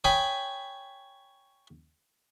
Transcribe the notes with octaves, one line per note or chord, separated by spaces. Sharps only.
C#5 G5 G#5 B5 D#6